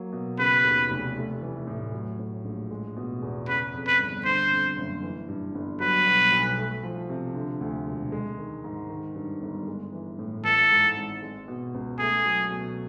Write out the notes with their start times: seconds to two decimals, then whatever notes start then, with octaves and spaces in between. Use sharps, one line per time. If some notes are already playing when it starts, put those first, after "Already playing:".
Already playing: F#3 A#3
0.13 B2
0.39 C#3 B4
0.64 D#2
0.90 F1
1.16 A3
1.42 E3
1.67 A2
1.93 F#3
2.19 A2
2.45 A#1
2.71 G#3
2.96 B2
3.22 E2
3.48 C#3 B4
3.73 F2
3.87 B4
3.99 G1
4.25 D3 C5
4.51 F2
4.77 F#1
5.03 E3
5.28 G2
5.55 G1
5.80 F#3 B4
6.06 B2
6.32 B1
6.57 A3
6.83 F3
7.09 C3
7.34 D3
7.61 D2
7.86 E1
8.12 G#3
8.38 D#3
8.64 G#2
8.90 D#3
9.15 G2
9.42 G1
9.67 G#3
9.92 E3
10.19 A2
10.45 E3 A4
10.70 G#2
10.96 G#1
11.22 G#3
11.48 B2
11.74 C#2
11.99 A3 G#4
12.25 F#3
12.50 B2